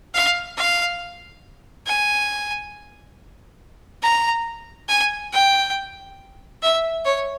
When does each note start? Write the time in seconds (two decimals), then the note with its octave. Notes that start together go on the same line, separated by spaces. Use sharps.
0.14 F5
0.57 F5
1.87 G#5
4.03 A#5
4.89 G#5
5.33 G5
6.62 E5
7.05 C#5